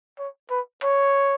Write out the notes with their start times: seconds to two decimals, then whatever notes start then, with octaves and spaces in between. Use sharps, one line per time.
0.19 C#5
0.51 B4
0.83 C#5